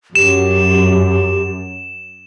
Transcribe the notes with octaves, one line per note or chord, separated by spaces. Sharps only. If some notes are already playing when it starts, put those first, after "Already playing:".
F#2 G4 E7